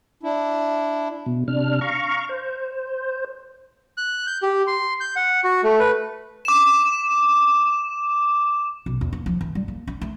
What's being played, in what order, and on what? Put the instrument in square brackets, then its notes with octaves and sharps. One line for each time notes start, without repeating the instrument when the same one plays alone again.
[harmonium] D4 E4
[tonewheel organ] B2
C3 D4 F6
F5 A#5 C#6
C5
[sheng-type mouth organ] F#6
G6
G4
C6
G6
F#5
F#4
A3
B4
[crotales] D6 E7
[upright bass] B1
E2
A#3
F3
E3
G3
A#3
D4
A3